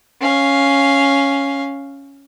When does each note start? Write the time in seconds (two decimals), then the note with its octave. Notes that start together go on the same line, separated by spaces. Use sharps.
0.21 C#4 F5